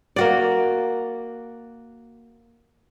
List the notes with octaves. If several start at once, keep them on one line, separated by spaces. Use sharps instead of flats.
A#3 F#4 D5